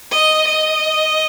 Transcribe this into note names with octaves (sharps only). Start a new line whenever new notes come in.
D#5
D#5